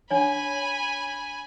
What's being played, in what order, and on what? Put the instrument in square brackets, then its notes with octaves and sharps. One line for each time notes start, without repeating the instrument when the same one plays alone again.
[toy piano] C#4 D4 C#5 [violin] G#5 B5